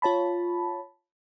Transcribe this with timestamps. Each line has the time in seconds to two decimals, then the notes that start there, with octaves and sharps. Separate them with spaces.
0.02 F4 C#5 A5 B5